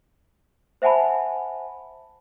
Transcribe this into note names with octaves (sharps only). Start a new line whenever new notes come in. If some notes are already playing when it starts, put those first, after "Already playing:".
C5 E5 F#5 G#5 A5 B5